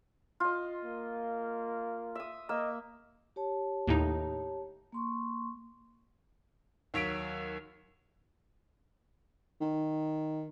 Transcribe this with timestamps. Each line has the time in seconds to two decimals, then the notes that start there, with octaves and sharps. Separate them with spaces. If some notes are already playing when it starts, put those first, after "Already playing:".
0.40 F4 D#5
0.85 A#3
2.15 E5 D#6
2.49 A#3 D#5 E6
3.36 G4 C#5 A5
3.88 D#2 A2 D#4
4.92 A#3 C6 C#6
6.94 D#2 F#3 B6 D7
9.61 D#3